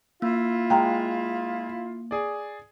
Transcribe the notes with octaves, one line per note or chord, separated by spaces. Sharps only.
A#3 E4 F4
G#3 F5 G5 A#5
G#4 D5